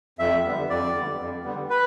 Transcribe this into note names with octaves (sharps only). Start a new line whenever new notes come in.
F2 E5
D3 G3 B3
F2 D5
D3 G3 B3
F2
D3 G3 B3
B4